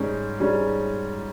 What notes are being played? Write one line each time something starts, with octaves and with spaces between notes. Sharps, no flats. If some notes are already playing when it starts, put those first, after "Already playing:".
Already playing: G#2 G3 C#4
G#2 G3 C#4